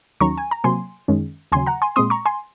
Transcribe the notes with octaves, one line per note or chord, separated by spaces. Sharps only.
D#2 D#3 F#3 C#4 A#5 C#6
G#5
A#5
C3 F#3 A#3 G#5 C6
F#2 D#3 G#3 C#4
D#2 C#3 F#3 G#5 C6
F#5 A#5
G#5 C6
A#2 G#3 C4 C6 D#6
A#5 C#6
G#5 C6